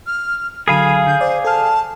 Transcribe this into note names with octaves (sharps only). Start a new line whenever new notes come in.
F6
D3 F#3 G#4 A4 F5 G#5 B5
D3 G6
C5 D5
A4 A5 F6